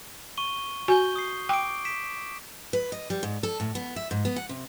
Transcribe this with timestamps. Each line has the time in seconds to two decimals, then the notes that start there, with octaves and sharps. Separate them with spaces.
0.37 C#6 D#7 G7
0.88 F#4 G#5 C#6 G6 G7
1.16 D#6 C7
1.49 G5 D6 D7
1.85 B6 D7 E7
2.73 B4
2.92 D#5
3.10 G3
3.23 G#2
3.43 A4
3.60 A2
3.75 B3
3.96 E5
4.11 G#2
4.25 B3
4.36 F#5
4.49 C3